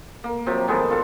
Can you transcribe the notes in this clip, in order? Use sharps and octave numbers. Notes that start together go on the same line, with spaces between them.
A#3
C3 F3 F#3
D#3 G#3 B3 A4
D4 F4 A4